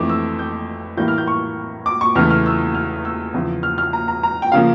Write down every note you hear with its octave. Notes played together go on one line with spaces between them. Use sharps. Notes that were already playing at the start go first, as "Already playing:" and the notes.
Already playing: F2 E3 A3 D6
E6
G6
A2 E3 G3 A#3 G6
F6
G6
C#6
D6
C#6
E2 C#3 E3 A3 F6
F6
E6
F6
E6
E2 C#3 F3
F6
F6
A#5
A#5
A#5
G5
C#3 F3 A#3 F5